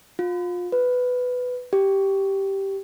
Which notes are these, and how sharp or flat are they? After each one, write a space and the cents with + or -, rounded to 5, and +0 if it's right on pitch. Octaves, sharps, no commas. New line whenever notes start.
F4 +25
B4 +10
G4 -5